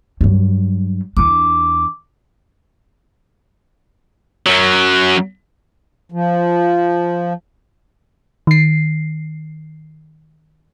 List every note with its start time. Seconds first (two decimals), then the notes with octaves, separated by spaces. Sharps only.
0.21 G2 F#3
1.17 E2 D4 D6
4.46 F#2 F#3
6.12 F3
8.47 D#3 C7